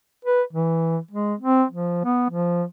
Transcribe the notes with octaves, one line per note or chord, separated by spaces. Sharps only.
B4
E3
G#3
C4
F3
B3
F3